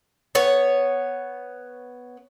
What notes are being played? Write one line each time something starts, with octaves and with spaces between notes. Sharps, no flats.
B3 C#5